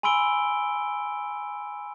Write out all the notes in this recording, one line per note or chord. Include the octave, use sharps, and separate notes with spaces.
G#5 B5 C6 E6 D7 G7